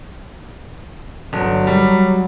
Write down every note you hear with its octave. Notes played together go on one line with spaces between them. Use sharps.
G1 F#3
G3